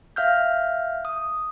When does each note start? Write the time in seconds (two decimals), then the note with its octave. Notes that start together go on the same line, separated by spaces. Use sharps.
0.16 E5 F5 F6 G6
1.05 D#6